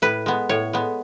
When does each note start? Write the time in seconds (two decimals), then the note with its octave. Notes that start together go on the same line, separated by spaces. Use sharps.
0.02 A2 B4
0.26 G#3 B3
0.49 A2 C#5
0.73 G#3 B3